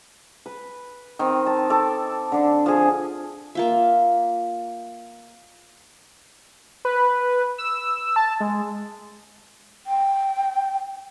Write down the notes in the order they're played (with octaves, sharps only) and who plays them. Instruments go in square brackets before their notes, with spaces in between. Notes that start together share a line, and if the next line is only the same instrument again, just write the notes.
[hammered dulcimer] B4
D#3 C4
A5
A4 D6
D3 D4
F3 G#4
[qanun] A#3 F4 E5
[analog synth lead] B4
E6
A5
G#3
[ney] G5